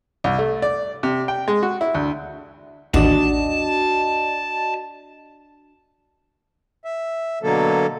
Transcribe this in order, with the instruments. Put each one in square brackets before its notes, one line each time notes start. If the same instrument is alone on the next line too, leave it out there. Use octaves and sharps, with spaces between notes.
[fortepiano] C2
A3
D5
C3
G5
G#3
F#4
E4
D2
[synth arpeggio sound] A1 D#2 [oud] D4 [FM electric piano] F#4 D5 D#5 [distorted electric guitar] A5
[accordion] E5
B2 D3 F#3 A#3 A4